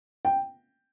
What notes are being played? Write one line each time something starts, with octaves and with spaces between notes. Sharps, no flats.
G5